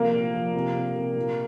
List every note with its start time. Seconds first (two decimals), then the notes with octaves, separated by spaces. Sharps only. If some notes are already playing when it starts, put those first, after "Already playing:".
Already playing: C3 F3 A#3
0.13 A#2
0.34 F3
0.55 C3
0.74 C3
0.95 C3
1.16 A#2